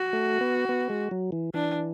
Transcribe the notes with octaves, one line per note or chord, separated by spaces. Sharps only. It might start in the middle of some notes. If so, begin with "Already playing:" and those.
Already playing: F#4
A3
B3
B3
G#3
F#3
E3
E3 D4